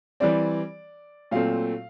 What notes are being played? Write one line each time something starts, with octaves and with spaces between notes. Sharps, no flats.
E3 G3 C4 D5
A#2 F#3 A3 C4 F5